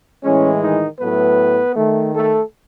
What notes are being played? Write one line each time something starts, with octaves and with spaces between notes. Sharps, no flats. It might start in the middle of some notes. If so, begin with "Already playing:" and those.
A2 E3 G#3 C#4
D#3 D#4
A2 F#3 A3 B3 B4
D#3 A3
A3 A4